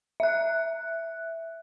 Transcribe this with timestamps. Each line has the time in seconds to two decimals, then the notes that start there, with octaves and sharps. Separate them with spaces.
0.20 E5 F#6